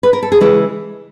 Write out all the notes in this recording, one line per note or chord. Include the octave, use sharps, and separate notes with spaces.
B4
A#4
A4
G#4
C#3 E3 G#3 G4